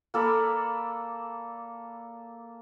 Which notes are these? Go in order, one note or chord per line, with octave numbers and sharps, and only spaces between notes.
A#3 A4 D5 B5